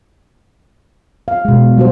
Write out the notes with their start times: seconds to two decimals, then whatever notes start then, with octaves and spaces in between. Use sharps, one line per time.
1.28 F5
1.45 B2 G#3
1.78 G3 F#4 C5